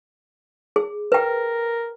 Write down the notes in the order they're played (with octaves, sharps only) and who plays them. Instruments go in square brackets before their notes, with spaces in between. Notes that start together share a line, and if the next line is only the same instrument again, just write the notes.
[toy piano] G#4
[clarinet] A#4 [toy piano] B4 G5